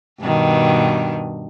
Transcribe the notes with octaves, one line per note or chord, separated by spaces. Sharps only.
G2 B2 D#3